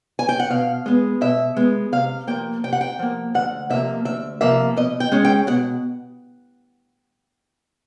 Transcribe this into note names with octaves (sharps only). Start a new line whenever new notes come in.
G#5
G5
F#5
B2 F5
G#3 B3
B2 E5
G#3 B3
C3 F5
F3 A#3 G5
C3 G5
F#5
G5
F3 A#3
D2 F#5
C3 F3 A#3 E5
D2 E5
C3 F3 A#3 E5
B2 D#5
G5
G#3 C#4
G5
B2 F#5